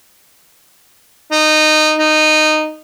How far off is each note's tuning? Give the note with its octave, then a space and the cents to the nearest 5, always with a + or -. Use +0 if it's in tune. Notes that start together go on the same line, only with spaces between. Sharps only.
D#4 -15
D#4 -15